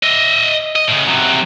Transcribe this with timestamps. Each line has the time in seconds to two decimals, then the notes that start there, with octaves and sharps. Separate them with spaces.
0.03 D#5 E5
0.75 D#5
0.88 A2 C#3
1.07 C3 F#3